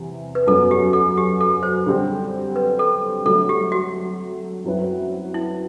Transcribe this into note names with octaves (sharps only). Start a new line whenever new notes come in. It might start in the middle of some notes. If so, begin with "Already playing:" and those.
Already playing: E2 C3 E3
B4
F#2 F#3 B3 A4
G4
A4
G4
A4
C5
D3 G3 C4
B4
A4
D3 F#3 A3 A4
G4
F#4
F#2 F#3 C4 E4 B4
E4